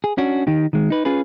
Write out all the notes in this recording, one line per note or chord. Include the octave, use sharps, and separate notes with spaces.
G#4
C#4 D4 F#4
D#3 D#4 G4
D#3 G#3
D#4 B4
C#4 F4 G#4 B4